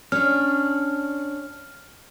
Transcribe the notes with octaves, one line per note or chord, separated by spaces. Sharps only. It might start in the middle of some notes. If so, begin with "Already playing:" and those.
C#4 D4 F6